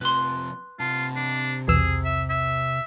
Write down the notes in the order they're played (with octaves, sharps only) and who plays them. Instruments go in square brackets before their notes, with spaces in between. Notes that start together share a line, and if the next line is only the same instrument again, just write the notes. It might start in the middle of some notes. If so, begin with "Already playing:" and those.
[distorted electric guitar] C3 F3 [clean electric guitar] B4 C6
[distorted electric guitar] C3 A5 [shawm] F4
[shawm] D4
[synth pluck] B1 E2 E6 [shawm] G#4
[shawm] E5
E5